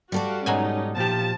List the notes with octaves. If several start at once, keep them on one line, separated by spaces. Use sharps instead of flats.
G3 F#4 A4 D5 F5
G#2 B2 F#3 C#4 D#4 G#5 A#5
A#2 F3 G4 A5